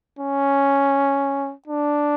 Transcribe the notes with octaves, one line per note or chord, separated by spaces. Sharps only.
C#4
D4